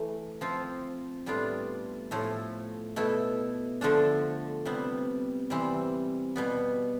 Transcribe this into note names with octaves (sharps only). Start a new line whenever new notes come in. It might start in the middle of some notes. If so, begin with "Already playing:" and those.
Already playing: E3 A3
F3 C4 F4
A2 G3 B3 D4 F4
A2 F3 A3
B2 A3 E4
D3 F3 A3 D4
C3 G3 B3
C3 E3 G3 C4
B2 G3 B3